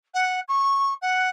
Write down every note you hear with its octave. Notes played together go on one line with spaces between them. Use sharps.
F#5
C#6
F#5